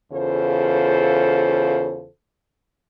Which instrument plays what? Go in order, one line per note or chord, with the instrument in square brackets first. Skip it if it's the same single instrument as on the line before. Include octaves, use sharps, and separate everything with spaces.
[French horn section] E2 C#3 F4 A4 C5